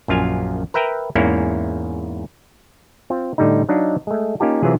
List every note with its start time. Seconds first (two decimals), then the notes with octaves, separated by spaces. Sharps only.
0.08 A#1 F#2 F4 F5 G#5
0.74 A#4 B4 E5 G5 A#5
1.15 E2 G#2 A#3 C#4 E4
3.10 C4 F4
3.38 A2 D3 G3 A3 D#4
3.69 F#3 D4 D#4 D#5 F5
4.07 G#3 A3
4.40 A#3 C#4 D#4 F4 G4 A5
4.63 C3 E3 F#3 F4 G#4